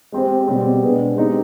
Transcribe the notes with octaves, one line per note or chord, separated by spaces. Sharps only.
G#3 C4 G4 C5
B2 G3 C4
B2 G#3 D4 G#4 B4
G#3 C4 D#4 G4